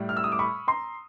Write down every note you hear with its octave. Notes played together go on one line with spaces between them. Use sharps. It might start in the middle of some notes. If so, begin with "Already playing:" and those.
Already playing: A2 G3
F6
E6
D#6
D6
B5 C#6
A#5 C6